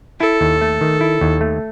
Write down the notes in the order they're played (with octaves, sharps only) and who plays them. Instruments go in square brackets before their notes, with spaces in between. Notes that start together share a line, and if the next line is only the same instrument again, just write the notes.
[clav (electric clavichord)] E4 [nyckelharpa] A4
[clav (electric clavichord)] D#2
A3
D#3
E4
D#2
A3